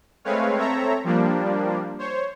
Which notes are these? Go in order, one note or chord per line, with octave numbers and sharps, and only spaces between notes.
G#3 A3 C4 B4 C#5 F5
C4 A4 C#5 E5 A#5
F3 G3 A#3 D4
C5 C#5